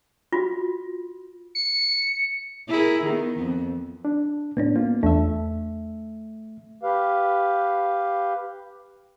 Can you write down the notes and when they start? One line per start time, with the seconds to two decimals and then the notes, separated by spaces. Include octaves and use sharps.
0.33 F4 F#4
1.55 C#7
2.69 E4 G#4 A#4
3.04 D#3 B3
3.40 F2
4.05 D4
4.57 A2 B3 C#4 D4
4.76 A#3 B3 F4
5.03 E2 A3 D4 E5
6.83 G4 B4 F5